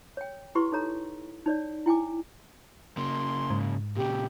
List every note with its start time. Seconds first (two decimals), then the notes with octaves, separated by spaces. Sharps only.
0.17 C#5 G5
0.55 E4 G4 B4 C6 C#6
0.72 D#4 A4 C#5 A#5
1.46 D#4 C#5 D5
1.86 E4 G5 G#5 D6
2.97 C#3 A#3 C6
3.50 G#2
3.96 A#2 C#3 G4